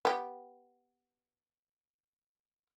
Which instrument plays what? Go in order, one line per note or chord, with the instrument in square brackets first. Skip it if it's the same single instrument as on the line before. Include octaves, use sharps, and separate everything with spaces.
[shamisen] B3 G4